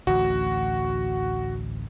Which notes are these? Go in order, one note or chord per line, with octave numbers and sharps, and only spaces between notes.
A1 D2 F#4